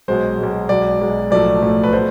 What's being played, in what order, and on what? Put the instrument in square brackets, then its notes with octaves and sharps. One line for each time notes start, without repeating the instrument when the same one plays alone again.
[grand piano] B1 B2 G#3 C5
B1 B2 G#3
B1 B2 G#3 D5
B1 B2 G#3
B1 A2 F3 A3 D5
B1 A2 F3 A3
B4
B2 A3 C5